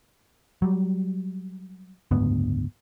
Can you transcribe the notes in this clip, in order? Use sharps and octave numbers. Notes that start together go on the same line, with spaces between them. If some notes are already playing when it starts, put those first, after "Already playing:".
F#3 G3
F#1 D2 G#2 B3